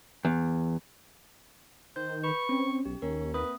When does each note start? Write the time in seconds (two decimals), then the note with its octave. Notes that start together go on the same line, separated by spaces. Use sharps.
0.25 E2
1.96 D#3 C5 G6
2.23 B4 B5 C#6
2.49 C4 C#4
2.85 B1 G4
3.02 D#2 C#4 A#4
3.34 A#3 C4 B4 D#6